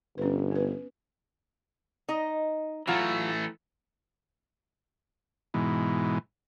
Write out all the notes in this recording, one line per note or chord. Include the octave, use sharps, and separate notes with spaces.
G1 C#4 B4
B3 B4
D#4 D#5
E3 F#3 A3 F4
G#2 B2 E3